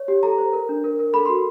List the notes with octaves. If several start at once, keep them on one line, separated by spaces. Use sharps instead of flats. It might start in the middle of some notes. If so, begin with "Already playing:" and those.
Already playing: C#5
G4
A4 A#5
C5
A#4
D4
A#4
A#4
A4 B5
F#4 C6